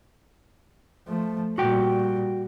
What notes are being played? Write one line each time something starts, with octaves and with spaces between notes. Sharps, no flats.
F3 A3
A#2 G3 F#4 G5